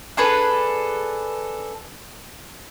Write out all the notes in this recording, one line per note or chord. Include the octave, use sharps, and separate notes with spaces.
D4 G#4 A4 B4